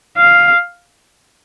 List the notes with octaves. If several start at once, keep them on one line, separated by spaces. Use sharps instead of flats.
F5